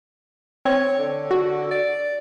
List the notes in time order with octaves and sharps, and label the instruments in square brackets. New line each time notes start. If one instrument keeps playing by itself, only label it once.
[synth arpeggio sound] C4 [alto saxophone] C#5
[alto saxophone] D3
[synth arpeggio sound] F#4
[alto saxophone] D5